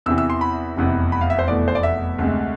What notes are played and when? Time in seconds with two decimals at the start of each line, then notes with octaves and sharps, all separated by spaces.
0.06 E2 C3 E3 E6
0.18 E6
0.30 C6
0.41 B5
0.77 F1 E2 C3
1.12 B5
1.21 F5
1.30 E5
1.39 C5
1.48 F1 E2 B2 A3 D5
1.68 C5
1.75 D5
1.83 E5
2.19 D2 C3 G#3